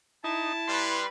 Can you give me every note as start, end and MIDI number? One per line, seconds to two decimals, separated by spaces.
0.24 0.53 63
0.24 1.02 64
0.24 0.80 81
0.68 1.08 55
0.68 1.08 71
0.68 1.07 84